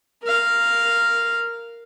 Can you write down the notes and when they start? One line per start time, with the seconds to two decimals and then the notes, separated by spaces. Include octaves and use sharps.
0.23 A#4 F5